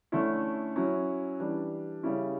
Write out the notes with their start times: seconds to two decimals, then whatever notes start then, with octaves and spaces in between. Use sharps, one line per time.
0.12 D3 A3 C#4 E4
0.76 F#3 C#4 E4
1.40 E3 G3 D4
2.03 C#3 G3 C#4 E4